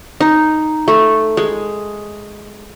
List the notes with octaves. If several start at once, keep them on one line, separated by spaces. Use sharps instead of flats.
D#4
A3
G#3